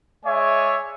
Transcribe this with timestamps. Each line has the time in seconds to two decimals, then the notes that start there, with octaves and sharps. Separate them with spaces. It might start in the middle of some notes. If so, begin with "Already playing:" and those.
0.24 G#3 C#5 D5 E5 G#5